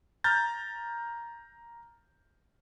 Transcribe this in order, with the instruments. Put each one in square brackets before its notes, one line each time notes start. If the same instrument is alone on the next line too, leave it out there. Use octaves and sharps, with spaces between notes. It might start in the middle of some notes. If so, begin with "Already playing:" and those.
[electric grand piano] A#5 F6 G6 A6